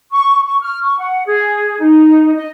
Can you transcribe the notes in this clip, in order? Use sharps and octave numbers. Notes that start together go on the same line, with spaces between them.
C#6
C#6
F6
C#6
F#5
G#4
D#4
D#5